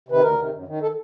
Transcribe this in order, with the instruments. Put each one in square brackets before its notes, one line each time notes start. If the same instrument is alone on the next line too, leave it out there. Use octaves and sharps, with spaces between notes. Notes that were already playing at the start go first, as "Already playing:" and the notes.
[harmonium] C3 D#3 B4
D2 A#4
C3 D#3
F#2
D#3
A4